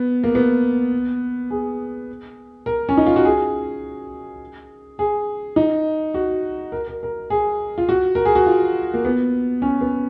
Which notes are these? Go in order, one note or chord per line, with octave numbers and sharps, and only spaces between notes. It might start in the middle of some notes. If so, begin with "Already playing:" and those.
Already playing: B3
A#3
B3
G#4
A#4
C#4
D#4
F4
F#4
G#4
G#4
D#4
F#4
A#4
A#4
A#4
G#4
F4
F#4
A#4
G#4
F#4
F4
A#3
B3
C#4
B3